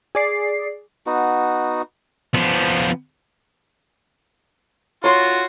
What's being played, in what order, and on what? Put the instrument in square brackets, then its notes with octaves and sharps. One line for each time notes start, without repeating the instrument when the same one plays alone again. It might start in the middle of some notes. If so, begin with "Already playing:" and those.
[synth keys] G#4 D5 C7
[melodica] B3 D#4 F#4
[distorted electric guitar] F3 B3
[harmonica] F4 F#4 [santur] C#5 C6